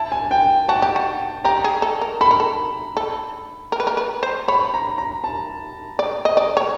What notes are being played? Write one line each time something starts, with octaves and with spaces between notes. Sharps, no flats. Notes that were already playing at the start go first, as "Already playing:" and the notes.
Already playing: E4 A5
G#5
G5
F#4 A5
G4
F#4
G4 A#5
G#4
A4
A#4
A4 B5
A#4
A4
A4
A#4
B4
A#4
B4
C5
C#5 B5
A#5
A#5
A5
D5
D#5
D5
C#5